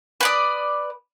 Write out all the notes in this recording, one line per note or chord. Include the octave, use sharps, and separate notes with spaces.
B4 D5 D#6